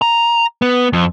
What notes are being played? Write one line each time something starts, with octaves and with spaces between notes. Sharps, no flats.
A#5
B3
F2